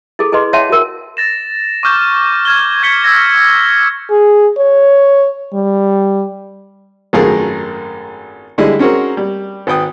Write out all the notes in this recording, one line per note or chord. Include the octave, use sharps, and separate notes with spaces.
E4 G#4 A4
E4 G#4 B4 D#5 C6
C#5 E5 F#5 G5 A5 C6
F#4 A#4
A6 A#6 E7
C#6 D6 F6 G6
F6 G#6 G7
F6 G#6 B6 C#7 G7
E6 F6 G#6 A#6
G#4
C#5
G3
G#1 F#2 A3 F4 G#4 A#4
D3 G3 G#3 E4 G#4 D#5
C4 C#4 F#4 G#4 A#4
G3
G#1 B4 G5 D#6